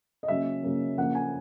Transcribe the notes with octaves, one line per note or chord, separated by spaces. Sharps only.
D#5
C#3 F#3 A#3 C#4 E5
C#3 F#3 A#3 C#4
C#3 F3 A#3 C#4 F#5
G#5